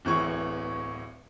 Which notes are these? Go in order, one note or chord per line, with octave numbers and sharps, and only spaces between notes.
D1 E2 A2 E3 C#6